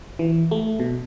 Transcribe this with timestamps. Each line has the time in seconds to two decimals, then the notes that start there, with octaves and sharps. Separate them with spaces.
0.19 E3
0.51 A3
0.80 B2